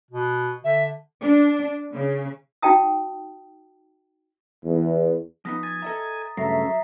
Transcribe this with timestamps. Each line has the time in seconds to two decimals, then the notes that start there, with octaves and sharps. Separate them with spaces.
0.11 B2
0.64 D3 E5
1.21 D4
1.92 C#3
2.62 D#4 F#4 D#5 G5 A5 D#6
4.65 E2
5.45 F3 B3 D#4 D#6 A#6 B6
5.63 G#5 A6
5.82 A4 D#5 E5 A#5
6.37 G2 C#3 F#3 A3 E5 A#5 A#6 C7